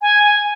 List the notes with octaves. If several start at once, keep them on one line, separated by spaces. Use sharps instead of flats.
G#5
G#5